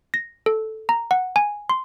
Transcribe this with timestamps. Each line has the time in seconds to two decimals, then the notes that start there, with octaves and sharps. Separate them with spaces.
0.14 A#6
0.46 A4
0.89 A#5
1.11 F#5
1.36 G#5
1.69 C6